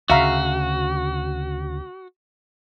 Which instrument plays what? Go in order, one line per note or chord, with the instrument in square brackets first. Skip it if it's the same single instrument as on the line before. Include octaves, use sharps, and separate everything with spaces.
[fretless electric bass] D2 C#3 [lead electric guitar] F#4 [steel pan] E5 F5 A#5